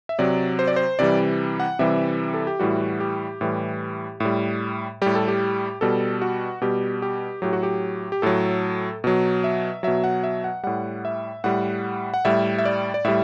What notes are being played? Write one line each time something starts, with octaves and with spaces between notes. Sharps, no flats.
E5
C3 F#3 D5
C5
D5
C5
C3 E3 G3 D5
F#5
C3 E3 G3 E5
A4
G4
A2 E3 G3 F#4
G4
A2 E3 G3
A2 G3
A2 G3 G4
A4
G4
B2 G3 A4
F#4
B2 G3 G4
G4
A2 F#3 G4
F#4
G4
G4
A2 F#3 A4
B2 F#3
E5
B2 F#3 E5
F#5
E5
F#5
A2 G3 F#5
E5
A2 G3 F#5
F#5
A2 G3 E5
E5
D5
D5
A2 G3 E5